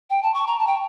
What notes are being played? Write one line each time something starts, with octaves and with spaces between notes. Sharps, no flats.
G5
A5
C#6
A#5
A5
G5